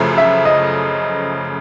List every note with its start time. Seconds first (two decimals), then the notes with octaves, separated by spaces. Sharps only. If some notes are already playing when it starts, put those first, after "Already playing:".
Already playing: F#2 C#3 F3 A3
0.18 E5
0.45 D#5